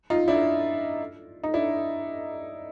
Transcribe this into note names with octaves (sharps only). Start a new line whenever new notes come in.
D#4 F4
D4 E4
D#4
D4 E4